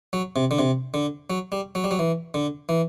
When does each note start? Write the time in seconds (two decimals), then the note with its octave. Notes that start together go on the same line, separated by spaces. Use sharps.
0.13 F#3
0.36 C3
0.51 D3
0.59 C3
0.94 D3
1.30 F#3
1.52 G3
1.75 F#3
1.84 G3
1.91 F#3
1.99 E3
2.34 D3
2.69 E3